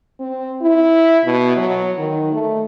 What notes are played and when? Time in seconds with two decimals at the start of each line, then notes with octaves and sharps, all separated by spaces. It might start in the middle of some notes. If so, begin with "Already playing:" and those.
0.20 C4
0.61 E4
1.25 B2
1.57 F#3
1.98 D#3
2.32 A3